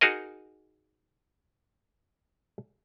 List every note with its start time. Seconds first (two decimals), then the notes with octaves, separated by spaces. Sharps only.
0.01 D#4 F#4 G#4 A#4 D#5